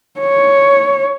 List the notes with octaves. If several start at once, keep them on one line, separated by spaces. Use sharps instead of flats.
C#5